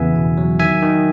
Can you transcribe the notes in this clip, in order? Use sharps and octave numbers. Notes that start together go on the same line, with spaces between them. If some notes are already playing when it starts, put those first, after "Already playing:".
Already playing: E2 C#3 E3 B3 E5 G#5
B2
F#3
D#3 E5 G#5
D#3